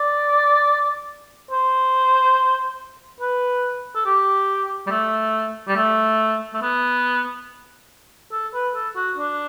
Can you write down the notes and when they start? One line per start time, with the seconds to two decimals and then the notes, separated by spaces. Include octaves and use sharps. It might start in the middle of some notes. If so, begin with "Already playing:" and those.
Already playing: D5
1.51 C5
3.20 B4
3.95 A4
4.06 G4
4.87 G3
4.91 A3
5.68 G3
5.76 A3
6.54 A3
6.62 B3
8.32 A4
8.54 B4
8.75 A4
8.96 F#4
9.17 D4